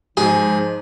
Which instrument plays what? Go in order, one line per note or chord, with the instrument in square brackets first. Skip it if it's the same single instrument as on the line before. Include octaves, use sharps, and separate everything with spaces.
[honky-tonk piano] G#2 [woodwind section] F3 D#4 [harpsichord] G#4